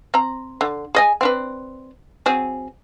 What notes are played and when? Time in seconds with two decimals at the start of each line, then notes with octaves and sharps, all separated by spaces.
0.14 C4 A#5
0.61 D3
0.95 G#4 D#5 G#5
1.21 C4 D4 B4
2.26 F#3 C4 G#4